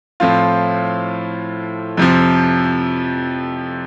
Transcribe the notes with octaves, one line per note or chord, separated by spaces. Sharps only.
A2 F3 C4 F4
F2 C3 F3